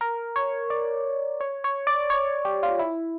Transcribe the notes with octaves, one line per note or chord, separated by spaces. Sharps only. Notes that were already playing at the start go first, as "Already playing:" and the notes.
A#4
C#5
D5
C#5
C#5
D5
C#5
G4
F4
E4